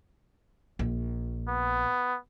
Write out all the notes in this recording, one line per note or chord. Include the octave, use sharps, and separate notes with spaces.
A#1
B3